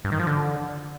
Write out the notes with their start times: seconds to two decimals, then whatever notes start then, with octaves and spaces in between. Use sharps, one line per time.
0.05 G2
0.12 D#3
0.19 F3
0.27 D3